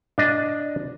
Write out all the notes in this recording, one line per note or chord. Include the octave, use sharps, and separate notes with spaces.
D4 D#5